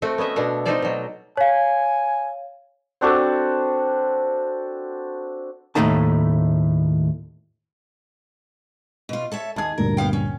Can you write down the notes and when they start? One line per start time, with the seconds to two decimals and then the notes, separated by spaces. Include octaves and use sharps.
0.02 A3 C4 F#4 G5
0.18 B3 C#4 D#5 E5
0.36 B2 B3 D4 F#5
0.66 C4 D#4 F4 A4 C5 D5
0.82 B2 F#3
1.37 C#5 F5 G#5
3.01 C4 D4 F#4 A4
5.75 D#2 A2 E3 A3 D#4 A5
9.09 B2 F4
9.32 A4 C#5 E5
9.56 D#2 G#4 A5 G#6
9.78 D2 G2 A#2 A#4
9.97 B3 F5 G5
10.13 C#4